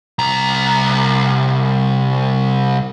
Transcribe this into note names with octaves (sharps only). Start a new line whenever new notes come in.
C2 A#5